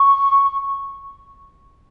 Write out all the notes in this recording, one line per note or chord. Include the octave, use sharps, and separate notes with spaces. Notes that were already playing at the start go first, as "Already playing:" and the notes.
Already playing: C#6